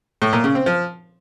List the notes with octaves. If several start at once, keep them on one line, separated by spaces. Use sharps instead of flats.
A2
A#2
C#3
C4
F3